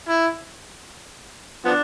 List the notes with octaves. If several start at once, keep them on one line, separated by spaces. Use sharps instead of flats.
E4
F3 B3 D4